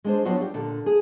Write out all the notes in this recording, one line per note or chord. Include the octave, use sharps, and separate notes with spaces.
G#3 D4 C5
F#3 G3 B3 D4 F4 F#4
G4
A#2 D3
G#4